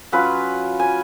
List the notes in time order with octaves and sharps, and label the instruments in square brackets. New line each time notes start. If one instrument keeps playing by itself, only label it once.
[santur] F#3 C#4 F4 B4
G#5